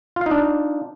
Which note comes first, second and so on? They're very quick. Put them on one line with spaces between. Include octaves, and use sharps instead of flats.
F4 F5 D#4 D4